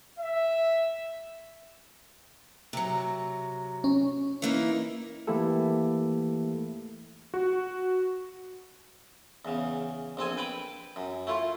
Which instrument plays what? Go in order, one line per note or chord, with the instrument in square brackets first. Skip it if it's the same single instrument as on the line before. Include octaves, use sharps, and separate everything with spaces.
[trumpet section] E5
[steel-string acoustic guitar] C3 F#3
[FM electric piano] C#4
[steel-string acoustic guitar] E3 A#3 D#4
[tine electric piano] E3 A3 A#3 E4 G4 A4
[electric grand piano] F#4
[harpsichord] E2 C#3
A#1 C4 A4 G#5
B4 G5 A5 B5
F#2
A3 E4 F4